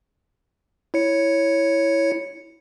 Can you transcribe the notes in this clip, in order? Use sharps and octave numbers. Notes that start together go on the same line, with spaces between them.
E4 C#5 C#7